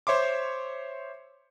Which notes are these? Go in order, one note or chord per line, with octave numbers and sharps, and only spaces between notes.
C5 C#5 E5 C6 D6